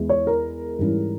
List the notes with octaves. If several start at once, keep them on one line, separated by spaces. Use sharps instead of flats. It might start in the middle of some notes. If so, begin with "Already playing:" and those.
Already playing: E2 E3 G#3 E4
C#5
A#4
G#2 E3 G3 C#4 E4